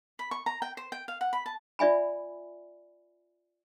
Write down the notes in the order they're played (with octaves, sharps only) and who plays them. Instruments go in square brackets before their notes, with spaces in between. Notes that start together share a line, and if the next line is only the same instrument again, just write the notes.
[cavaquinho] B5
C#6
A#5
G5
C5
G5
F5
F#5
B5
A5
[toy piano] F4 D5 E5 G#5 B5